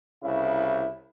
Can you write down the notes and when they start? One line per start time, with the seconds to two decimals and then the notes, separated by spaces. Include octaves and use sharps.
0.22 C2 C#3 E4